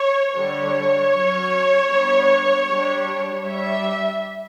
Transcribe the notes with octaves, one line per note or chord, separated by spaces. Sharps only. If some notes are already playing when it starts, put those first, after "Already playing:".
Already playing: C#5
D3 G3 D4 C#5
F#3 C#4
G3 B3 D4
G3 D4
G3 D4 E5